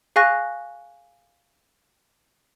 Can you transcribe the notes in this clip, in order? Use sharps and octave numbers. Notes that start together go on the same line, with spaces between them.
G#4 F5 G#5 C#6 F#6 A#6